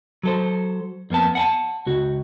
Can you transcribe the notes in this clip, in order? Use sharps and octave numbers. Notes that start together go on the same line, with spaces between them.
F#3 A4 C5
F2 A#3 B3 A5
F#5 G#5 A5
C#2 F#4